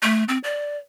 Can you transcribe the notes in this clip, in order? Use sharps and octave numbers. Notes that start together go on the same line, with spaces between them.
A3
C4
D5